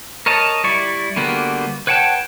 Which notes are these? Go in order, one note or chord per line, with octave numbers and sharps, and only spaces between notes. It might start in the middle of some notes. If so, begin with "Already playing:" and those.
A#4 C#5 D#5 A5
G3 E4 D5 C#6
D3 G3 A#3 B3 F#4
B4 C#5 F#5 G5 A5